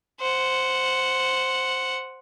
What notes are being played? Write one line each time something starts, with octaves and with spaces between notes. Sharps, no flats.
C5 F#5